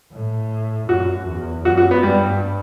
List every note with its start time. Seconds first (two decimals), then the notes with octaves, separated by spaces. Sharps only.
0.13 A2
0.89 F#2 F#4
1.27 E2
1.65 F#2 F#4
1.78 F#4
1.91 B3
2.03 G2 G3